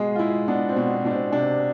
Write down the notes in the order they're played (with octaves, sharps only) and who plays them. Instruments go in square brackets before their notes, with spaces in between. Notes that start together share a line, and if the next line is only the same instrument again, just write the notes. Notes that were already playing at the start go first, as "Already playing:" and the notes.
Already playing: [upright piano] B2 G#3 G#4
F4
G#3 E4
B3 D4
C4
B2
B2 D4
C4
C3 D4